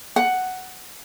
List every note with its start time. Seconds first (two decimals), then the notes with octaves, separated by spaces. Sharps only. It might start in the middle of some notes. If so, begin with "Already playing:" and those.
0.16 F#5